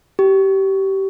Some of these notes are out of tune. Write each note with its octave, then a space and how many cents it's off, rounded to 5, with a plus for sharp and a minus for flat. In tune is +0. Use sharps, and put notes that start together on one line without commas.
G4 -25